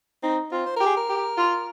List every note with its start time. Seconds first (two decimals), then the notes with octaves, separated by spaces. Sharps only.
0.23 C4 D#4
0.52 C4 F4
0.66 C5
0.77 G4 A#4
0.86 G#4
0.97 A#4
1.09 G4
1.37 F4